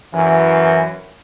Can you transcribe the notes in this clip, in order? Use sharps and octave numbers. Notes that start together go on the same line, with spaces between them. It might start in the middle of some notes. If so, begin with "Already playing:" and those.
F#2 E3